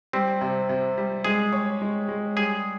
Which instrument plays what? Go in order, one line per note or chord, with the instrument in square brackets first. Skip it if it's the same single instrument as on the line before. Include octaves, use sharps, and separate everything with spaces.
[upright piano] G3 [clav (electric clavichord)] C4
[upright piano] C3
C3
G3
[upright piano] G#3 [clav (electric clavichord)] G#4
[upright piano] C#5
G#3
G#3
[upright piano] G3 [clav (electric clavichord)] G#4